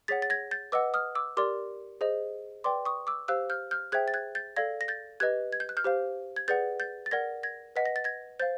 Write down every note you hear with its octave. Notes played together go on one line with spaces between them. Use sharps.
G#4 C#5 F#5 A6 B6
A6
G#6 A#6
G6 A6
B4 D#5 F#5 D6 E6
D#6 F6
D6 E6
G4 A#4 D5 C6 D6
G#4 C5 D#5
B4 D5 G5 C6 D6
C#6 D#6
D6 E6
G4 C5 F5 E6 F#6
F6 G6
F6 G6
G#4 C5 E5 G5 F#6 G#6
A6
F#6 G#6
G6 A6
A4 D5 F5 G#6 A#6
A#6
G6 A6
G4 B4 D#5 F#6 G#6
G#6
G6
F#6
F6 G6
G4 C5 F5
G#6
G#4 B4 D5 F#5 G6 A6
G6 A6
A6
A#4 D5 F#5 G#6 A#6
G#6 A#6
B4 D#5 F#5 B6
A#6
A6
G#6 A#6
C5 F5 G6 A6